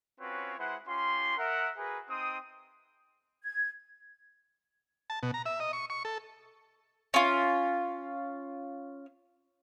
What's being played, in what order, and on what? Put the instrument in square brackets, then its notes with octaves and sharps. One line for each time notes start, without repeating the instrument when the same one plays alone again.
[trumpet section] C4 C#4 F4 F#4 B4 C#5
G#3 E4 B4 C5 F#5
C#4 F4 G4 C6
A#4 E5 F#5
F#4 G#4 A#4 B4
C4 D#4 G5 C6 D#6
[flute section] G#6
[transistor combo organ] A5
B2
A#5
E5
D#5
C#6
C#6
A4
[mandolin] C#4 F4